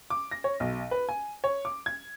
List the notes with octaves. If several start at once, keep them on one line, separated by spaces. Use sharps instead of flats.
D6
A#6
C#5
B1
B4
G#5
C#5
D6
G#6